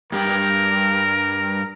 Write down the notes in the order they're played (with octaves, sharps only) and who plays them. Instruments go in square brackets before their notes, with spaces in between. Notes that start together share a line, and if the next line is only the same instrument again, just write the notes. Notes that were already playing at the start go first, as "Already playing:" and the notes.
[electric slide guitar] G2 G3 G5 [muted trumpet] A#4